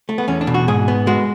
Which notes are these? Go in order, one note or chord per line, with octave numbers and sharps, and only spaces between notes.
A3
B3
E2 C#4
D4
B2
F#4
G#2 G#4
B3
G#3 F#4